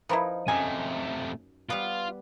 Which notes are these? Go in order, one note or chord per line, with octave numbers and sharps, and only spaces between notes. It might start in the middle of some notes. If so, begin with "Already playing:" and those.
F3 D#4 E4 A#4 B4
F#2 C3 A3 D#4 F5 G#5
G3 B3 F4